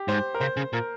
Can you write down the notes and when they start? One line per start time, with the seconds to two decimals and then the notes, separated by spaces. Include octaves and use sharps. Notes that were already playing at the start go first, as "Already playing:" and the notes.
Already playing: G4
0.08 G#2 C5
0.35 A#4
0.40 C#3 C5
0.57 C#3
0.73 A#2 A#4